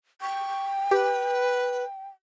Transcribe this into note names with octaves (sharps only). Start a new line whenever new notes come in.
G5 C#6
G4 B4